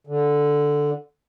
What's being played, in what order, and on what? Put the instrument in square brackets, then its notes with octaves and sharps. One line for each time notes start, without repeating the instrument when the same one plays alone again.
[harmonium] D3